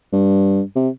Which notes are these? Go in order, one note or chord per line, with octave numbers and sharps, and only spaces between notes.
G2
C3